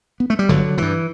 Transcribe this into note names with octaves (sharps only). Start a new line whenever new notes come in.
B3
A3
G3
G1 D3 F#3
G2 D3 E3